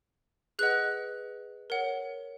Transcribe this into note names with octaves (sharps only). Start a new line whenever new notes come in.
G#4 B4 D#5 F#5 F#6
A#4 C#5 F#5